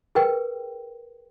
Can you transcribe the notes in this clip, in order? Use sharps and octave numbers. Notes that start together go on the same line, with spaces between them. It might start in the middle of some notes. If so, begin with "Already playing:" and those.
G#4 A#4 B4 G5